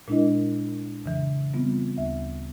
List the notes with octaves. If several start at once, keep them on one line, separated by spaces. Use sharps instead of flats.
A#2 G#3 D4 E4 A#4 D#5
F2 C#3 E3
G3 B3 C4 F4
D2 E5